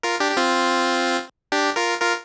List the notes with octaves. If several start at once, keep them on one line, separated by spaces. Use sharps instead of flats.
F4 A#4
D4 G4
G4
C4 F4
D4 G4
F4 A#4
F4 A#4